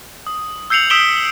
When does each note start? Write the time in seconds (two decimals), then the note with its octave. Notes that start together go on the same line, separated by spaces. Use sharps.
0.27 D#6
0.70 E6 G6 C7 C#7 F7 F#7
0.90 D#6 E6 B6 D7 E7 G7